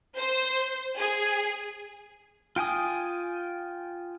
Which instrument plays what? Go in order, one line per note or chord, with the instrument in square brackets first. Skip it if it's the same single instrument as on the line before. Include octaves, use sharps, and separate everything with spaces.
[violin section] C5
G#4
[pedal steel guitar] F4 G5 G#5 D#6